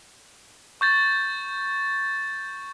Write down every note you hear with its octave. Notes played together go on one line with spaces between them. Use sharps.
C#6 G6 A6